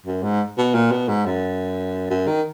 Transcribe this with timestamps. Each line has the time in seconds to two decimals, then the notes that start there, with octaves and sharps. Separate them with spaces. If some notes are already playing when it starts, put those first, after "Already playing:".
0.06 F#2
0.23 G#2
0.58 B2
0.74 A#2
0.91 B2
1.08 G#2
1.26 F#2
2.10 F#2
2.27 D#3